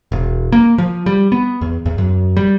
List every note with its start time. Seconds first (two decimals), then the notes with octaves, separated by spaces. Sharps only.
0.12 E1
0.52 A#3
0.78 F3
1.06 G3
1.32 B3
1.61 E2
1.86 E2
1.98 F#2
2.37 G3